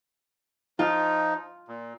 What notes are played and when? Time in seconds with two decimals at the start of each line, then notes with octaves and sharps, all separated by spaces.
0.79 F3 D#4 F4 F6
1.68 A#2